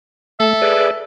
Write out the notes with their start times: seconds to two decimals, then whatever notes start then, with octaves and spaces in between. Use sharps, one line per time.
0.40 A3 A4 E5
0.62 G#4 B4 D5